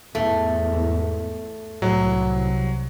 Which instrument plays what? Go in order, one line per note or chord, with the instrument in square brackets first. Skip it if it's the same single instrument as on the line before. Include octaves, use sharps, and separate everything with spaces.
[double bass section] E2 G#2 [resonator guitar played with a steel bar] A3
[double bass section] C2 [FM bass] A2 [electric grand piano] F#3